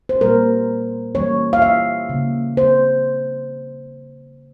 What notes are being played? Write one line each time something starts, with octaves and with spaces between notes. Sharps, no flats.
C5
A#2 G3 A#3 A#4
E3 G3 A#3 C#5
F5
E5
C#3 G3 A#3
C5